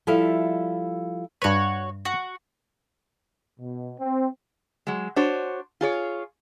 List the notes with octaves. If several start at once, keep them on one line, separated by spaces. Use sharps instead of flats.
F3 G3 E4 A4 E5 F5
G2 F#4 B4 C#5
F#4
B2
C4
F#3 G#3
D4 F#4 C5 C#5
F4 G#4 C#5